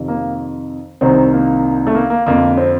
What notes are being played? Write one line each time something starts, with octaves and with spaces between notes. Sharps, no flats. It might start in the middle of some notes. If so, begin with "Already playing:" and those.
Already playing: F2 C3 D#3
A#3
C2 C3 D#3 C4
A#3
A3
A#3
A#3
F2 D3 A#3
C4